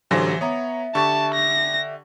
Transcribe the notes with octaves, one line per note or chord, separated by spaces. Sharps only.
A1 D3 E3 F#3 G4 C5 A#6
B3 C#5 E5 A#5
D3 G4 A5 C#6 A6
A#6